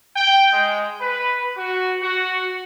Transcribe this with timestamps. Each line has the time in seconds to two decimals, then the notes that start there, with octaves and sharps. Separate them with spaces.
0.16 G5
0.53 G#3
1.00 B4
1.57 F#4
2.02 F#4